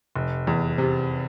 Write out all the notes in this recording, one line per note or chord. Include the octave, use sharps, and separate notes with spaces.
F1
E2
C3